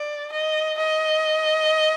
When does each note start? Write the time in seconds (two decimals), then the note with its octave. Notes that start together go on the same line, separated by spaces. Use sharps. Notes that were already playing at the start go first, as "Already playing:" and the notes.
Already playing: D5
0.32 D#5
0.78 D#5